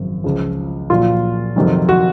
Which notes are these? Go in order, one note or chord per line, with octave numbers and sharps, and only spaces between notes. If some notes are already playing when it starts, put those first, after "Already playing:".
Already playing: G#1 F#2 C#3 F3
C#2 C#3 F3
A#1 A#2 F#3 F4
F2 C3 D#3 F#3
F#4